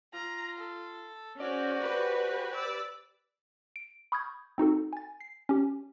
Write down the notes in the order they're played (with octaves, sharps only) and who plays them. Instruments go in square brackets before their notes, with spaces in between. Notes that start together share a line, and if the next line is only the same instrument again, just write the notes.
[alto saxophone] F4 [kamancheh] A#5
[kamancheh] A4
[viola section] C#4 [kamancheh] F#4 G#4 [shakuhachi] C5 [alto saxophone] D5
[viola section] G4 B4
[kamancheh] D5 E6
[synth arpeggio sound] D7
B5 C#6 D#6 F6 G6 G#6
C4 D#4 F#4 A4
G#5 A6
C7
C#4 G4